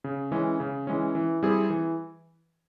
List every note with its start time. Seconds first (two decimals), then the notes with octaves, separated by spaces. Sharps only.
0.04 C#3
0.32 E3 G#3 C#4
0.60 C#3
0.87 E3 G#3 C#4
1.15 E3
1.43 G3 C4 E4 G#4
1.70 E3